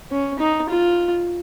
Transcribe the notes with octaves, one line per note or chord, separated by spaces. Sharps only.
C#4
D#4
F4